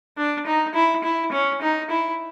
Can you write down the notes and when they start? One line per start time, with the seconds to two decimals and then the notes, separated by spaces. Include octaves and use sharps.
0.18 D4
0.46 D#4
0.75 E4
1.04 E4
1.32 C#4
1.62 D#4
1.90 E4